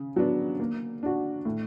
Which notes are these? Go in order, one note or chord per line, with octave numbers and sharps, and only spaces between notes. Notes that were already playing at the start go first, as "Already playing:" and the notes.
Already playing: C#3
F#3 B3 D4
A#3
D4 F#4
A2